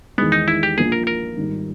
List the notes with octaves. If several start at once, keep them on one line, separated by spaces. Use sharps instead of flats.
E2 D#3 G#3 B3
D#4
E4
G4
A#1 A#2 A#3 G#4
A#4
A#4
G#1 G#2 G3